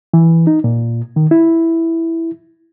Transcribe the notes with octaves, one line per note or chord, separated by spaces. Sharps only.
E3
D#4
A#2
D#3
E4